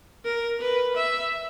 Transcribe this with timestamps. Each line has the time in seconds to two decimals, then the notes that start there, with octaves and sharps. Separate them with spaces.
0.25 A#4
0.61 B4
0.96 E5